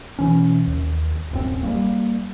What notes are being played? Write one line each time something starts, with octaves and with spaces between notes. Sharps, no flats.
B2 E3 C#4
D#2
D1 F#2 C4
G3 A3 A#3